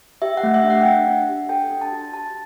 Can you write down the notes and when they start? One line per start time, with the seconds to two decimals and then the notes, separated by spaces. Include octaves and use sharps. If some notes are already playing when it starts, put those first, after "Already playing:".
0.22 G4 E5
0.37 F#5
0.43 A3
0.54 E5
0.64 D4
0.70 F#5
0.81 G5
0.85 D4 F#5
1.07 D4
1.29 G4
1.49 A4 G5
1.71 D4
1.81 A5
1.92 F#4
2.14 G4 A5